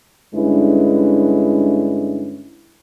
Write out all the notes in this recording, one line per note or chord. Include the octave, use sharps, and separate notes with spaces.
G2 D3 G#3 C#4 E4 B4